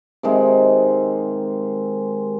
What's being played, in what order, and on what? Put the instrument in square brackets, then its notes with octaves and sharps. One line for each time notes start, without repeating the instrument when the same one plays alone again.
[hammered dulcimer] C3 D#3 G#3